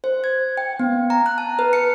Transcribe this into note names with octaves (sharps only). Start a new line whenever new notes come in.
C5
G#6
G5
B3
A#5
F#6
A5
B4
C#7